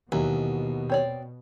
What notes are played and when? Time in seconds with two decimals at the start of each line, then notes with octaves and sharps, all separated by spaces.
0.12 D#2 B2 E3 F#3
0.90 C4 C#5 D5